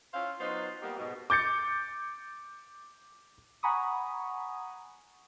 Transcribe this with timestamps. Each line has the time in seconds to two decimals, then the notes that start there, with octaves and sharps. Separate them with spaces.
0.13 C#4 E4 F4 C5 F5
0.39 F#3 B3 D#4 F4 C5
0.81 G3 A#3 B3 D#4 G4
0.98 G#2 B2
1.30 D6 G6 A6 C#7
3.63 F#5 G#5 A#5 B5 C#6 D#6